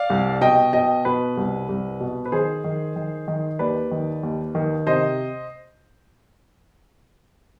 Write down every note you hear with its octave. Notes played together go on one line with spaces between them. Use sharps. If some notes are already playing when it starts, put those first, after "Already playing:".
Already playing: D5 F5
C2
B2 D#5 G5
B2 D#5 G5
B2 B4
C2
C2
B2
B4
D#3 G#4 C5
D#3
D#3
D#3
D#2 B4 D5
D#3
D#2
D#3
C3 C5 D#5